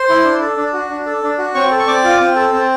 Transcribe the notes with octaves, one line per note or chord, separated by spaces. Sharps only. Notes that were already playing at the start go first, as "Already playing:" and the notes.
Already playing: C5 C6
E4
D4
A4
D4
F#4
D4
A4
D4
F#4
C4 C#5 C#6
A4
C#6
C4 D5 D6
F4
C4
A4
C4